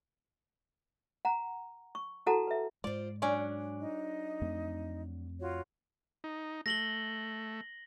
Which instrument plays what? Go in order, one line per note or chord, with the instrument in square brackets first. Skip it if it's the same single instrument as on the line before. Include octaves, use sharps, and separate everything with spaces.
[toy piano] F#5 A#5
C#6
E4 F#4 A4 F#5 A5 A#5
B4 E5
[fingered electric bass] G#2 G#3 [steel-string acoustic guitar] F4 C5 [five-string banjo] D5
[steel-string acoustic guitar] F#3 D4 [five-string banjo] C#4 D5
[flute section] D#4 D#5
[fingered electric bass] F2 A3 C4
[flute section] F4 F#4 C#5
[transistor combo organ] D#4
[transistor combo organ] A3 [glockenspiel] A#6 F#7 G7